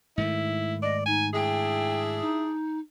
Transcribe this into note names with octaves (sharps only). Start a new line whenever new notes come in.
G#2 D#3 A3 E4
D5 D#5
D#4 G#5
D4 E4 G#4 G5
D#4